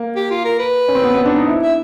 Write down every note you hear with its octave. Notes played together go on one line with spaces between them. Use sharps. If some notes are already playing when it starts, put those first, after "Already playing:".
Already playing: A#3
G4
F4
A#4
B4
C#4
C4
B3
B3
D4
D#4
E4
E5